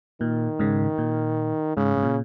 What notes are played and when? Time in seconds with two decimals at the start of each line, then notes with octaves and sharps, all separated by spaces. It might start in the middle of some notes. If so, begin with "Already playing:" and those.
0.21 A#2 D#3
0.59 G#2 C#3
0.98 A#2
1.77 G#2 C#3
1.97 G#2
2.03 A#2